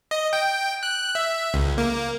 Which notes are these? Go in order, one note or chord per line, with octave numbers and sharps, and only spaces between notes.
D#5
G5
F#6
E5
C#2
A#3